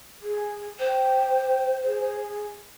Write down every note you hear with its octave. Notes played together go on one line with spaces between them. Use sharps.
G#4
C5 G5
G#4